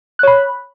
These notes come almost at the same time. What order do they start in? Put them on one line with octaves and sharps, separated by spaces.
F#6 C#5 B5